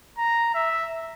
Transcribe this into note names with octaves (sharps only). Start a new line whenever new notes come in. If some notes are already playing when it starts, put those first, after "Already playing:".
A#5
E5